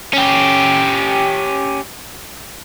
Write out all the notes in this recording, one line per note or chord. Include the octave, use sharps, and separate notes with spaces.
C#4 G4